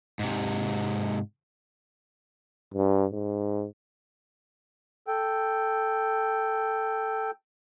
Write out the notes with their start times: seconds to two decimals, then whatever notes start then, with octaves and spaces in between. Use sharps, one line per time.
0.19 G#2 C3
2.74 G2
3.12 G#2
5.08 A4 G5